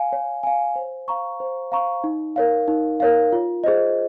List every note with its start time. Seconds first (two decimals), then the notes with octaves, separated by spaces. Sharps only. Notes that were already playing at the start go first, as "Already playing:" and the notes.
Already playing: F5 G#5
0.13 C#5
0.43 F5 G#5
0.76 C5
1.08 F5 A#5 C#6
1.40 C5
1.72 F5 A#5 C#6
2.04 D#4
2.36 A#4 C#5 F5
2.68 D#4
3.00 A#4 C#5 F5
3.33 F4
3.64 G#4 C5 D#5